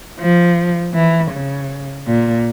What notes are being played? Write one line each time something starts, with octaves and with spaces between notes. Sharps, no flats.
F3
E3
C#3
A#2